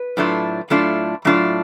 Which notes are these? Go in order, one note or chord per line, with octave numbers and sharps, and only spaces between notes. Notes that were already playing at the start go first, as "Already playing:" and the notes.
Already playing: B4
A2 F#3 A3 D4 F4
A2 F#3 A3 D4 F4
A2 F#3 A3 D4 F4